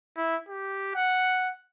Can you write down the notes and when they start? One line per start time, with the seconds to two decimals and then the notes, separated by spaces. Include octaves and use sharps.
0.17 E4
0.49 G4
0.95 F#5